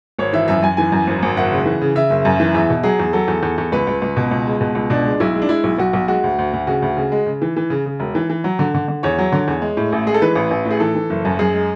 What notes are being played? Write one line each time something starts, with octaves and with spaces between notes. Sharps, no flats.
G#1 C#5
E3 E5
F#2 E5
F#2 G#5
E3 G#5
F#2
G#1
G#1
F#1 F#5
C#3
E3
C#3
C#3 E5
F#1
F#2
E3
E2 E5
B2
F#3 G#4
E2
F#3 A4
E2
E2
E2
C#2 B4
C#2
C#2
B2
C#2
G#3
B2
C#2
B2 D4
G#3
B1 E4
G#3
D4
G#3 E4
B1
B1 F#4
B1
G#3 F#4
D2
D2
D2
C#3 F#4
D2
C#3
G#3
C#3
E3
E3
C#3
C#3
E1
E3
E3
F#3
D3
D3
D3
E2 C#5
F#3
D3
E2
G#3
A2
A1
G#3 G#4
A4
E3 B4
A1
A1
A2
G#4
E3 A4
E3
F#1
F#2
F#2 G#4
G#3